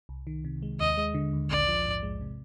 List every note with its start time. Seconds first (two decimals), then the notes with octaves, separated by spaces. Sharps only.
0.09 C2
0.27 D#3
0.44 C3
0.62 G#3
0.80 D#2 D#5
0.97 G#3
1.14 D3
1.33 D#2
1.50 A#1 D5
1.68 F3
1.86 G#2
2.03 G#3
2.21 C3